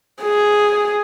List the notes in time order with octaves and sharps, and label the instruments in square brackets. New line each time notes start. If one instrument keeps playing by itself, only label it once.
[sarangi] G#4